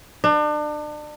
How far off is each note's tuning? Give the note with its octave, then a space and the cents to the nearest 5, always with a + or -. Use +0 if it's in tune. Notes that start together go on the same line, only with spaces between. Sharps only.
D4 +35